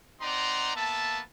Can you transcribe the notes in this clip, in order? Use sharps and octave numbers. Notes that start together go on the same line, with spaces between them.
C4 D#4 D5 F#5 A#5 C6
A#3 B3 E5 A5